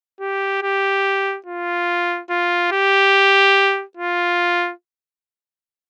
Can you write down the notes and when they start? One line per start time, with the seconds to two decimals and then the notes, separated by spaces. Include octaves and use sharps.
0.21 G4
0.63 G4
1.46 F4
2.30 F4
2.72 G4
3.97 F4